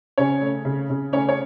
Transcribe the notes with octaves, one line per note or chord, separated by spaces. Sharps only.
C#3 C#4 C#5
A3
C#3
C#3
A3 C#4 C#5
C#5